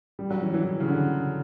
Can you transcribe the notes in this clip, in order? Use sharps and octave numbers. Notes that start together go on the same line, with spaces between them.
G3
F#3
E3
E3
E3
C#3
D3